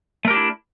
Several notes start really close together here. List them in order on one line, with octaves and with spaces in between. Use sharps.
A3 A#4 G4 D4 E4